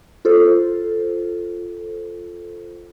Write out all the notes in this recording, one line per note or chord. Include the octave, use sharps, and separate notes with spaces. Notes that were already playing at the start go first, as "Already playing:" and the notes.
F4 A4 C5